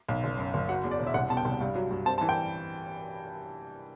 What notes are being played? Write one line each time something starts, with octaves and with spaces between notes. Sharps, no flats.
B1
F#1
F#2
F#1
F#3 F#5
E2
D5
E1
E5
C2 F#5
B2 A5
G5
C2
G2
F#3
G2
C4 A5
A5
E3
G5